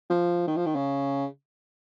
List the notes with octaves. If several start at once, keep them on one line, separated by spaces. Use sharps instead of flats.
F3
D#3
F3
D#3
C#3